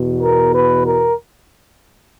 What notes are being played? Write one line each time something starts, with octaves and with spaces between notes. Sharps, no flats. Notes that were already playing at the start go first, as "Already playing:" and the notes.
Already playing: E2 B2
A#4
B4
A#4